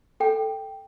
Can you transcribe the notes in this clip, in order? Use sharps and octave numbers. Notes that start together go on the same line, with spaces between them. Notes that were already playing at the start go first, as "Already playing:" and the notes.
A4 G5